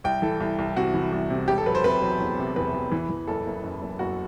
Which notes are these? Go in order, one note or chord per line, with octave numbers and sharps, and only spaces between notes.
C2 G5
E3 A4
C2
C2
C3 F#4
E3
C2
C3
E1 G4
A4
F#3 B4
C5
C3 B4
F#3
E2
C3
E2 B4
E2
E3
E3
F#1 A4
F#1
F#2
F#1
F#1 F#4